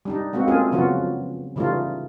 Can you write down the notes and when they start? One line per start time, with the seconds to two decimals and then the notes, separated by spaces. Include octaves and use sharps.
0.05 G3 D4 D#4
0.33 G#3 A#3 C4 F#4
0.48 A3 C4 C#4 F4 G#4 A#4
0.72 C#3 F3 F#3 B3 F4 F#4
1.56 C#3 E3 G3 A3 D#4 F4